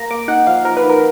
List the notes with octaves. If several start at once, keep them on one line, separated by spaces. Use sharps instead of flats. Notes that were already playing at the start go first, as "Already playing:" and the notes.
Already playing: A#3 A#5
A#3 D6
D#4 F#5
F3 F5
F3 A#4
B4
D#4
A#4